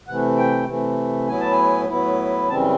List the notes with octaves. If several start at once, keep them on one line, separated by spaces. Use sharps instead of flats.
C3 E3 A3 F#5
G5
C3 E3 A3
A2 F#3 B3 E4 G#5
A5
G#5
A2 F#3 B3 E4
F#2 C#3 E3 G3 C4 A5